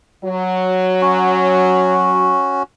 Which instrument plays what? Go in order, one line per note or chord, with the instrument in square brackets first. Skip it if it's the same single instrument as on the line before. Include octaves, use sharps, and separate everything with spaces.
[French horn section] F#3
[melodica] C#4 F#4